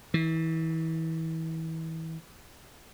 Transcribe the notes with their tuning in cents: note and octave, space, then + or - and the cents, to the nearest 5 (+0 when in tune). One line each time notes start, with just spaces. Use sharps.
E3 -30